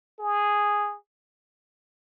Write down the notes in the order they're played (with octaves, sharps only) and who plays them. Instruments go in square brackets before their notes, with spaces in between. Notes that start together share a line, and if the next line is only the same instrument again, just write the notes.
[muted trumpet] G#4